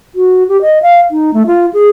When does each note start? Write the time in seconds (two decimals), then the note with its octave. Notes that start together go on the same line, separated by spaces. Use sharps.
0.15 F#4
0.49 G4
0.62 D#5
0.82 F5
1.11 D#4
1.34 A3
1.47 F4
1.73 G#4